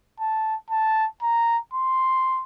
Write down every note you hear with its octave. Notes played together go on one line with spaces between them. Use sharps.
A5
A5
A#5
C6